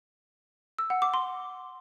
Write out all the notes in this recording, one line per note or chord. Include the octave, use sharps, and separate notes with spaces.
E6
F#5
D6
C6